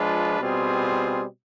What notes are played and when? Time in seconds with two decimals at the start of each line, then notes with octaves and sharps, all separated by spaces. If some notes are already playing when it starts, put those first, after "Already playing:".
Already playing: F3 G#3 D4 F4 B4
0.40 B2 G3 C4 F4 G#4